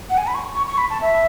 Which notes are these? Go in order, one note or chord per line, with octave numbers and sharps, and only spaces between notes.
F#5
G#5
B5
C#6
C#6
C#6
B5
A5
E5